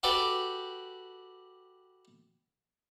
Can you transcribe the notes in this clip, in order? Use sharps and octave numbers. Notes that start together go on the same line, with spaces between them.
F#4 G4 A4 B4 D5 G5